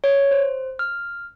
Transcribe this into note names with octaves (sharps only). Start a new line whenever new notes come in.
C#5
C5
F6